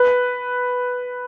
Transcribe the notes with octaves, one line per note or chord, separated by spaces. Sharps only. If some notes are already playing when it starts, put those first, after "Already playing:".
Already playing: B4